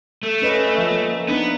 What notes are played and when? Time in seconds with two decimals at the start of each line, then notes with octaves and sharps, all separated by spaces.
0.23 A3
0.42 C#4 B4 D#5
0.78 F3
0.91 A#3
1.29 B3 D4 D#4